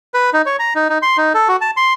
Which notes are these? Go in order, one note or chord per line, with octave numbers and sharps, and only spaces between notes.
B4
D#4
C#5
A#5
D#4
D#4
C6
D#4
A4
F#4
A5
C6